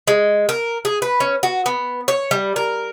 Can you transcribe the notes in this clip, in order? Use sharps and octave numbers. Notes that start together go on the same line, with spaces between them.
G#3
A#4
G#4
B4
C#4
F#4
B3
C#5
G3
A#4